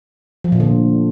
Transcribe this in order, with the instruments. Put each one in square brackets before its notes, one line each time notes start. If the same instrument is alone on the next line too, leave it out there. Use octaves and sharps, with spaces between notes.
[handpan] F3
A#2
D3